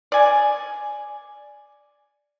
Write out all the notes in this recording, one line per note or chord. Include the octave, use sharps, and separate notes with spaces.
D5 G#5